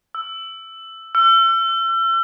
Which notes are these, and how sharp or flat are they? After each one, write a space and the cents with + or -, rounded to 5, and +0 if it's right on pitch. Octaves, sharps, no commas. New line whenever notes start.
E6 +5
E6 +40